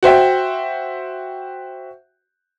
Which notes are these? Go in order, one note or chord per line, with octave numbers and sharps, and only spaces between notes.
F#4 C5 E5 G5